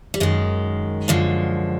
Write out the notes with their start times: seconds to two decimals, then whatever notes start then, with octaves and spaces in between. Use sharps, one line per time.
0.14 G3
0.20 F#2 D#3 G#3
1.08 F#2 D3 F3